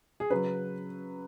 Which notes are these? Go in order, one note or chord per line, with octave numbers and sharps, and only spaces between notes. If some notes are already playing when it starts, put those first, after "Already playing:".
G#4
C#3 F#3 B4